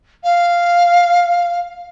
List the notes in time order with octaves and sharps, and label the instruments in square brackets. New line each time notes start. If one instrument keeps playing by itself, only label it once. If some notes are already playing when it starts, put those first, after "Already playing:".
[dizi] F5